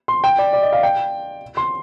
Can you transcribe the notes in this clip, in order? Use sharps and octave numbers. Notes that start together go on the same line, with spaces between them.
C6
G5
D5
D5
D#5
F5
G5
C6